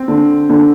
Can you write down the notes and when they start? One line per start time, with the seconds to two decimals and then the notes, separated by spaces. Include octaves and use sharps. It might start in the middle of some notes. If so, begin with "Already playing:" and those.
Already playing: C4
0.08 D3
0.50 D3